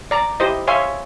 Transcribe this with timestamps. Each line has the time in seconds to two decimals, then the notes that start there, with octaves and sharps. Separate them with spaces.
0.11 D5 A#5
0.40 E4 G4 C5 D#5
0.67 C#5 E5 F5 G#5 C6